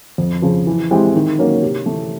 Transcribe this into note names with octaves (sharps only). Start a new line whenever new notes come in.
F2
C#3 F3
E3
G#3 C4 E4 G4
D#3
F#3 A#3 C#4
C3
E3 A3